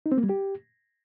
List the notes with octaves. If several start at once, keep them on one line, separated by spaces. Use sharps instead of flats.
D#4
C4
A#3
G3
G4